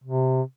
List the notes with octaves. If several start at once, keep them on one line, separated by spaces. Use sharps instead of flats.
C3